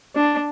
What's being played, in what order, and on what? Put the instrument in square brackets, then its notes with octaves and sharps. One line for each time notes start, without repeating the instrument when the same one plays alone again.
[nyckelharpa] D4